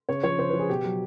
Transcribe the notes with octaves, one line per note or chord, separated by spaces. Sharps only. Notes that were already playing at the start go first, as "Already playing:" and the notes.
C#3 C#5
F3 C#5
C#3 C5
B4
F3
G#4
B2 G4
F#3